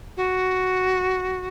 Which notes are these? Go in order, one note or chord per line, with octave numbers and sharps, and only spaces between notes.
F#4